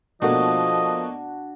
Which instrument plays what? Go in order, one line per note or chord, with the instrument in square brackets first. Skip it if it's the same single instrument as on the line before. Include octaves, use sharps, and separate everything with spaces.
[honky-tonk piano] B2 A3 A#3 [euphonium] F3 [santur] D4 F#4 [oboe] D#5